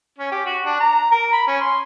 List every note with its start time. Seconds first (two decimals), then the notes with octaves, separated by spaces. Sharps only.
0.18 C#4
0.31 G4
0.46 F#4
0.65 D4
0.80 A#5
1.11 A#4
1.33 B5
1.47 C#4
1.60 C6